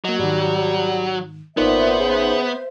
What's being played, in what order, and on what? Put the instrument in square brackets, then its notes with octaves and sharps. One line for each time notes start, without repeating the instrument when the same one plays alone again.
[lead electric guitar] F#3 [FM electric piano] A#3 D#5
[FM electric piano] G#2 D#3 [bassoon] G3
[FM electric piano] G#1 D#4 [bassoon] A#2 [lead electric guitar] B3 [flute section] C5 E5
[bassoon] C#3